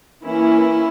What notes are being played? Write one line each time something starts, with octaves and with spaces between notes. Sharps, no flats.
E3 A#3 C#4 E4